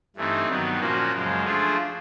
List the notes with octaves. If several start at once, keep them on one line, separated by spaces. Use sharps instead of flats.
G2 E3 A3 C4 D#4
G2 D#3 F#3 B3
A#2 F3 A#3 C#4 F#4
F#2 C#3 F3 G#3
F3 A3 D4 F4 G#4